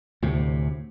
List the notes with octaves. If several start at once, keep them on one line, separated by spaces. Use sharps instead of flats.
D2 A2 C3